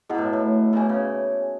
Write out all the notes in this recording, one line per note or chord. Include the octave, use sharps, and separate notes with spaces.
B2 E4 G#4 D#5 F#5
A2
A2
B2 G#4 C#5 G#5
C#3